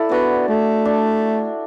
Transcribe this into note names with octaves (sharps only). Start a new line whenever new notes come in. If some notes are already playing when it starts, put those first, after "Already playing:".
Already playing: E4 A4 D5
B3 D4 F#4
A3
D4